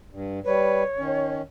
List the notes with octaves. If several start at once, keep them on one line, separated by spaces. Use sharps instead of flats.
G2
G3 B4 C#5
D#3 C#4